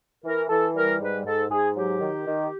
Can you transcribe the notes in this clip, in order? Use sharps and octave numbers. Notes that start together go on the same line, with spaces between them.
E3 A#4
E3 A4
G3 A#4
G#2 B4
G#2 A4
G#2 G#4
F#3 G4
D#3
D#3